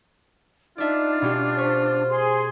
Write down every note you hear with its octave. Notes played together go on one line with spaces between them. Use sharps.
D4 D#4 F4 D5 E5
B2 C#4 G4
C5 C#6 B6
G#4 C6